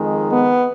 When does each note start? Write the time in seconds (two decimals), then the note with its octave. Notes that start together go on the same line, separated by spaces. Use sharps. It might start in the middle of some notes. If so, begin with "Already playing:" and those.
Already playing: F2 D#3 G#3
0.30 B3